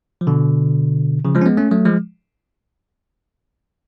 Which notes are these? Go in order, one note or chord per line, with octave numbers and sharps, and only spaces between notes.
F3
B2 D3
C#3 F3
F3 G#3
C#4
G#3 B3
A3 C#4
F#3 A3
F3 G#3